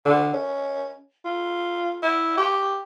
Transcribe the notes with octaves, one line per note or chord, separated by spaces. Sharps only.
D3
C#4
F4
E4
G4